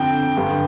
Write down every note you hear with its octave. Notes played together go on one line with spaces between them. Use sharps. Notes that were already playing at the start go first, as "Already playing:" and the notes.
Already playing: F2 D3 G5
G2 D3